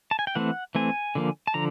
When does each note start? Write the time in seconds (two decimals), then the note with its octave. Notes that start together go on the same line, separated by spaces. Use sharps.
0.11 A5
0.19 G#5
0.27 G5
0.35 E3 A3 C4 F#5
0.75 E3 A3 C4 G#5
1.15 D3 F3 A#3
1.47 A5
1.54 D3 F3 A#5